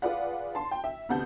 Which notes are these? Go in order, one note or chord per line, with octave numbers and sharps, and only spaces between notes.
F4 G#4 B4 D5 F5 F#5
A5 C6
G5
E5
D2 C3 B3 F#5 A5 G6